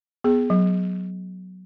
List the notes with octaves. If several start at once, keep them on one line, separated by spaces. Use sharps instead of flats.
B3 G#4
F#3